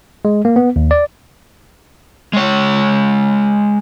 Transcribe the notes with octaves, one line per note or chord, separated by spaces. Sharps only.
G#3
A#3
B3
D#2
D5
G#3 C#5